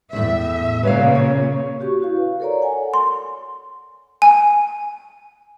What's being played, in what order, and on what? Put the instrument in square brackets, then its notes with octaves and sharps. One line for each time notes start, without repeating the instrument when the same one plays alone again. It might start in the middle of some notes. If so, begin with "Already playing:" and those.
[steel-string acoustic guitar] E2 A2 [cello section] E5
[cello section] A#2 C#3 [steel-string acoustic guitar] B4 C#5 F5
[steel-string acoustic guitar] C#5
[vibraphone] F#4 G4 C#6
E4 F#4 F5
B4
A4 A#4 C#5 D5 A#5
F#5 G#5
[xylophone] C6
G#5